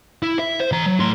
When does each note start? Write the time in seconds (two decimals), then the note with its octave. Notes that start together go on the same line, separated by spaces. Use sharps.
0.22 E4
0.39 E5
0.60 C5
0.72 E3 A#5
0.86 F#3
0.99 A2 C6